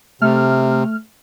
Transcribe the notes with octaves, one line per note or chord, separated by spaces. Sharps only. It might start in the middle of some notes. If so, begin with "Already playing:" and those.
C3 A3 F6